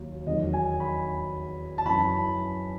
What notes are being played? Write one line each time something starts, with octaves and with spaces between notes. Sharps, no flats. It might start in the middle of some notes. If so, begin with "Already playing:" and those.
Already playing: D#2 F#3
E2 D#3 F#3 D#5
G#5
B5
A5
F#2 E3 B5